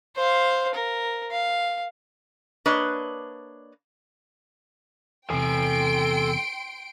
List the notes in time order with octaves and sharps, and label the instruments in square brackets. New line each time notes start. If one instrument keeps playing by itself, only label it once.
[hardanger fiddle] C5 F5
A#4
F5
[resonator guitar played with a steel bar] A#3 D4 B4 C#5 D#5
[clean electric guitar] E2 C3 [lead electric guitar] A4 G#5 [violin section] G5 C6 D7